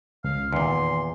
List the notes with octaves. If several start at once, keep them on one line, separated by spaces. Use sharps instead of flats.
C#2 F5
E2 A#2 D#3 C6